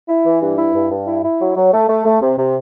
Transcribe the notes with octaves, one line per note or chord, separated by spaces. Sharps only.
E4
E3
G2
E4
G2
G2
E4
E4
F#3
F#3
A3
A3
A3
C3
C3